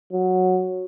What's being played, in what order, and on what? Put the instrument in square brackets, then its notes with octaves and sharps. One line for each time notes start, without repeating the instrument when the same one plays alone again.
[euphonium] F#3